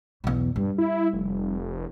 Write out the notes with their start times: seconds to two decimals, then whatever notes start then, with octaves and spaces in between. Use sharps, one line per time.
0.24 B1 E2
0.56 G2 G3
0.78 E4
1.13 F1